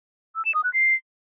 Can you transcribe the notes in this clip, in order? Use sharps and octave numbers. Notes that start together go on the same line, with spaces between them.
E6
E7
D#6
F#6
C7